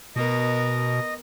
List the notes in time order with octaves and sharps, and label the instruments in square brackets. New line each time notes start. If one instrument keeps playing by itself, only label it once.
[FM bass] B2 [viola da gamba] B3 A#4 [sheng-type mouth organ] D#5